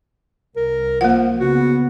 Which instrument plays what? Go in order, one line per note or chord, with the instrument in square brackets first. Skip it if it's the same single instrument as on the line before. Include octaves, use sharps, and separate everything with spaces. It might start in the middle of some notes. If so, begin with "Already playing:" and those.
[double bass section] C2 [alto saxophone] A#4
[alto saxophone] F3 [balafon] A#3 F#5
[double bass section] C#3 B3 [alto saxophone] F#4